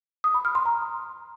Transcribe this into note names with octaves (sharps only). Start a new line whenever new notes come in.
D#6
B5
F6
C6
A#5